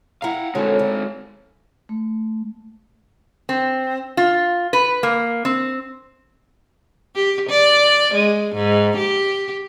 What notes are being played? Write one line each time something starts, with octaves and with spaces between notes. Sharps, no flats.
E4 F5 F#5 A#5
D3 G#3 C4 F#4 C#5
D2
A3
C4
F4
B4
A#3
C4
G4
D5
G#3
G#2
G4